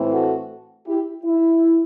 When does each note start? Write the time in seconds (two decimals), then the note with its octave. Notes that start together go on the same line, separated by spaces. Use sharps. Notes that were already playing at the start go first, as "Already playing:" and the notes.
Already playing: A2 E3 A3 C4
0.12 F#4 A4
0.87 E4 G4
1.24 E4